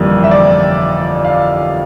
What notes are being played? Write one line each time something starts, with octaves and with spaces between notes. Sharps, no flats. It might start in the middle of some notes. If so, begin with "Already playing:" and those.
Already playing: G1 F2 E3 G3 A#3
E5
D5
F5